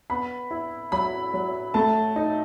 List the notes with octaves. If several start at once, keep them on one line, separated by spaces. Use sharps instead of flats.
B3 B5
E4
F#3 B5
F#3
A3 A5
D#4